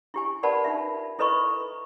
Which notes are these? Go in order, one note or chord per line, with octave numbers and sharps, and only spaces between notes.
E4 G4 G#5
A#4 B4 D5 F#5 A5 B5
D#4 F4 E5
E4 A4 B4 D#5 B5 C#6